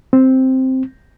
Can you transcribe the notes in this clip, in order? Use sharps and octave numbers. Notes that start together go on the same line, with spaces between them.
C4